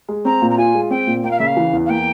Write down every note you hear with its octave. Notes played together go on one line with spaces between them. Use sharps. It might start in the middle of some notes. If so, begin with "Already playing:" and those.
G#3
C4 A#5
A#2
A#5
F4 G#5
G#3
C4 G5
A#2
A#3 G5
F5
C#3 E5
F5
E3
E2
F5
A#3 G5